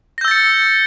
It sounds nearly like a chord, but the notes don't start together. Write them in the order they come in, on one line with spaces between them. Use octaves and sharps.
A#6 G6 E6 A6 C#7